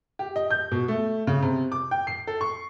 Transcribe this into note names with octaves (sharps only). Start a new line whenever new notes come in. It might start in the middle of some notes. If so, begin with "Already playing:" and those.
G4
D#5
G6
B2
A3
C#3
C3
D6
G5
C7
A4
C#6